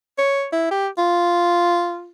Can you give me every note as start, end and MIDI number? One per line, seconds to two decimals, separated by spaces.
0.18 0.47 73
0.52 0.69 64
0.71 0.88 67
0.98 2.10 65